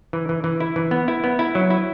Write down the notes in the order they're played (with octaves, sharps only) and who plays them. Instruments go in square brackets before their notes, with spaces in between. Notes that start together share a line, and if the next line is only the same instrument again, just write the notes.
[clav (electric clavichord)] E3
E3
E3
E4
E3
B3
E4
B3
E4
F#3
E4